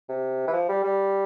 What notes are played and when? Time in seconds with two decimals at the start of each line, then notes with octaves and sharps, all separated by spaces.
0.09 C3
0.48 E3
0.53 F3
0.69 G3
0.84 G3